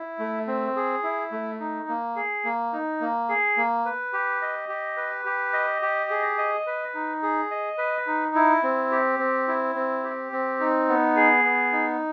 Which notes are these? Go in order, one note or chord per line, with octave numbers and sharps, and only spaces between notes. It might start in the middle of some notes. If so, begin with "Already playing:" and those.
Already playing: E4
A3
C4
G#4
E4
A3
D#4
A#3
G#4
A#3
D#4
A#3
G#4
A#3
B4
G4
D#5
G4
B4
G4
D#5
G4
G#4
D#5
B4
D#4
G#4
D#5
B4
D#4
E4
C4
G4
C4
E4
C4
G4
C4
D#4
B3
G#4
B3
D#4